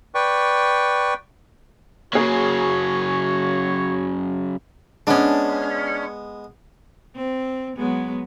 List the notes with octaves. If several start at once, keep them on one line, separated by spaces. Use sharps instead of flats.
B4 D5 G5 C#6
C#3 F#3 A#3 F#4 G#4 C#5
G#3 B3 C#4 D4
C4
F#3 G#3 B3